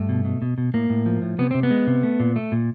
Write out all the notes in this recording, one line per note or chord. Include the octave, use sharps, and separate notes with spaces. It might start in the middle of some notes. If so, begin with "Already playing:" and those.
Already playing: G2 A3
B2
B2
B2
B2
A2 A#3
A2
F3
A2
C3 B3
C3 C4
B3
G#3
C3
A3
A#2
A3
A#2